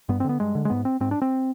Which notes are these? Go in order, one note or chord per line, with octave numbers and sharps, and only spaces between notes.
G2 B3
C4
D3 B3
G2 G#3
D3
G#3
G#2 B3
C4
G#2 C4
D4
C4